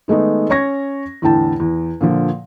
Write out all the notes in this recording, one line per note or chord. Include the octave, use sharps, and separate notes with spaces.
D#3 G#3 A3 B3 D#4
C#4 C#5 C#6 G#6 A#6
E2 A2 D3 G5 A5
E2
A#2 D3 F3